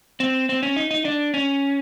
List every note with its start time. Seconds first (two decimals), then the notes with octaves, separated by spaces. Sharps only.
0.20 C4
0.49 C4
0.63 C#4
0.76 D#4
0.91 D#4
1.05 D4
1.34 C#4